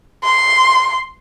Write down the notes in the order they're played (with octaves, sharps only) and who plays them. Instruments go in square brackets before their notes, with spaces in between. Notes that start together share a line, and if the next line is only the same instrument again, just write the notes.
[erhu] C6